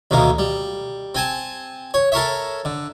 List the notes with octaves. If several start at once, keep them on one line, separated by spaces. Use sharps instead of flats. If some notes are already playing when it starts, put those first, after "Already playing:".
D2 B2 D#3 A#3
G3
C4 G#5 A5
C#5
A4 A#4 C#5 E5
D3